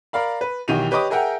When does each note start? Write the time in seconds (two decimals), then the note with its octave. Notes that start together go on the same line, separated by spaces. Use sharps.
0.13 A#4 D5 F5 B5
0.41 B4
0.68 B1 D#3 E3 G4 D#7 F7
0.91 G4 B4 C#5 D#5 D6 D#6
1.10 G#4 A#4 E5 F#5 G5 A#5